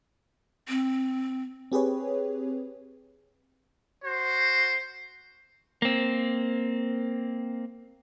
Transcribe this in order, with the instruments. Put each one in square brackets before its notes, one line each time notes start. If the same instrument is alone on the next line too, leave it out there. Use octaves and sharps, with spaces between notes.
[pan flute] C4
[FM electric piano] C4 G4 G#4 B4 C#5
[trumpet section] F#4 C5
[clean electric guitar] A#3 C4